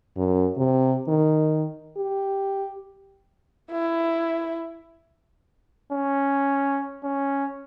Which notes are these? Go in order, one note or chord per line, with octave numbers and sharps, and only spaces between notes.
F#2
C3
D#3
G4
E4
C#4
C#4